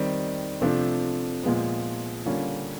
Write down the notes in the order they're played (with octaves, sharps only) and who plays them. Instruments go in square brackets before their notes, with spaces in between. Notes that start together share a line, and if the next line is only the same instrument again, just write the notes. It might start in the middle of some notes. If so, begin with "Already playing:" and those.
Already playing: [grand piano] D#3 G3 C4
C3 F3 A3 D4
A#2 F3 G#3 B3
D3 G3 A#3 C#4 F4